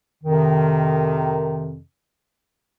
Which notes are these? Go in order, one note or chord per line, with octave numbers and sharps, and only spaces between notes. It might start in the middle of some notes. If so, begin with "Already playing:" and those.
F2 C3 D#3